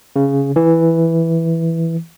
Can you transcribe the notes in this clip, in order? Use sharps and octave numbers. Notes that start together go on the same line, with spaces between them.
C#3
E3